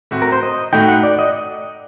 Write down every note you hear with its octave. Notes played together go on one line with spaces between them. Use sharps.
A2 A3 C4 F#4
A#4
C5
D#5
A2 A3 D#4 F#4 G5
F#5
D5
D#5